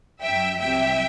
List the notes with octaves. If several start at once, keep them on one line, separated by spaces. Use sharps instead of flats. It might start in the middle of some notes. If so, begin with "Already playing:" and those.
F#2 F#3 E5 G5
C2 C3 F#3 E5 G5